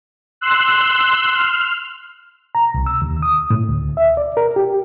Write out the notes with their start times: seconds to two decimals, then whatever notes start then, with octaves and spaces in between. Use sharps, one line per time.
0.41 C6 E6 F#6
1.34 F6
2.55 A#5
2.74 C2
2.86 E6
3.02 D#2
3.22 D#6
3.50 A2
3.69 D2
3.97 E5
4.17 D5
4.37 A#4
4.56 G4